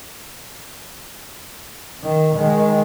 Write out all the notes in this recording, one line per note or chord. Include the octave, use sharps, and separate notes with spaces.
D#3
D#3 G#3